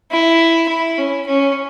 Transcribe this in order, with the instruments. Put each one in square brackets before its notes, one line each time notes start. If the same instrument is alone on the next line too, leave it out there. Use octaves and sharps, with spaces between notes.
[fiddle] E4
E4
C#4
C#4